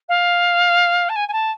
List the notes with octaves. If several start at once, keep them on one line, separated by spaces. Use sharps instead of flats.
F5
A5
G#5
G#5
A5